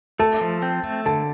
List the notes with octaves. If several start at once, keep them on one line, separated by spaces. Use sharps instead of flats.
A3 A4 A5
F3
C4
A3
D3 A4 A5